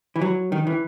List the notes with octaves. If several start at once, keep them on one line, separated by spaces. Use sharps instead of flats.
E3
F#3
D#3
E3